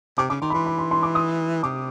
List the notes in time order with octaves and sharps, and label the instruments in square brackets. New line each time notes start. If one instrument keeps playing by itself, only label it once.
[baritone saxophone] C3 [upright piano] D6
[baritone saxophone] C#3 [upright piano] D6
[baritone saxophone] D#3 [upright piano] C6
[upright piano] B5
[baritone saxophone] E3 [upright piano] C6
[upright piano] B5
C6
C6
D6
D#6
[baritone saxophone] C3 [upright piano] D6